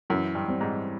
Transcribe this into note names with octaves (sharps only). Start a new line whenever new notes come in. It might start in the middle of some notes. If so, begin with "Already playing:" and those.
F#2 E3
G2
G3 C4
G#2